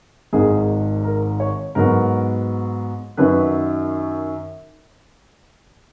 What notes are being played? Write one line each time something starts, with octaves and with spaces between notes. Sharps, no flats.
G#1 G#2 D#3 G#4
A#4
C#5
G#2 F#3 B3 A#4
F#2 D#3 F#3 B4